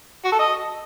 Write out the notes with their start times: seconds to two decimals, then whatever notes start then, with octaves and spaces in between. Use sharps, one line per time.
0.24 F#4
0.32 A4
0.39 D#5